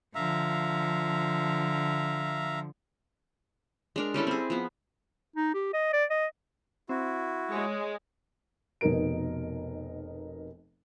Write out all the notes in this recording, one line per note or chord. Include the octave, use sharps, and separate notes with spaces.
D3 F3 E5 F5 A#5
G#3 D4 A#4
G3 C#4 E4 A4
C4 G#4
F3 B3
D#4
G4
D#5
D5
D#5
C4 E4 F#4
G#3 C#5
F1 B2 D#4 A#4 D7